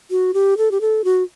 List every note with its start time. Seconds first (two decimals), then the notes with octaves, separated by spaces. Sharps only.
0.11 F#4
0.34 G4
0.57 A4
0.71 G4
0.81 A4
1.04 F#4